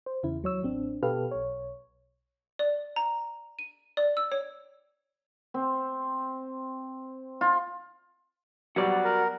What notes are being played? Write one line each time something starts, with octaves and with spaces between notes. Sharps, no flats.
C5
E2 C#3 E4
D#2 F#3 C#5 E6
A1 C4 D4
B2 G4 A4 B4 F5 F6
B1 C#5
D5
A#5
D#7
D5
E6
C#5
C4
F4
F#3 G3 B3 F#4 D5 F#5
A#4